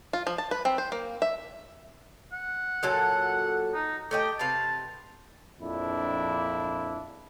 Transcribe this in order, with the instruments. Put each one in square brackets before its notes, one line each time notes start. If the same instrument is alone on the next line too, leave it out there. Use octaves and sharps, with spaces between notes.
[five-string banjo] F4
F3
A5
B4
C4
C5
A#3
E5
[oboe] F#5
[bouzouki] A#2 F#3 A4
[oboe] D#4
[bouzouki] A3 D#5 G5 [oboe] G4
[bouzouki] C3 B4 F5 [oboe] A5
[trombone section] A#1 F2 D4 E4